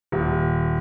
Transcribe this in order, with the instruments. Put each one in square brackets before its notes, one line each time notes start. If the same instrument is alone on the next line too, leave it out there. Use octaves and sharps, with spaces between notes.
[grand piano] D#1